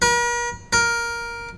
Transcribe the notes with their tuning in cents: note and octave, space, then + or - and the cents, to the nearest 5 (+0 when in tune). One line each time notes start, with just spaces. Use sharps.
A#4 +45
A#4 +10